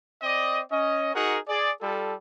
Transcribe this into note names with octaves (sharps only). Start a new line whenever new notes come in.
C4 D5 D#5
C#4 D#5
D#4 F#4 G#4 A#4 F#5
G#4 D5
G3 F4 A4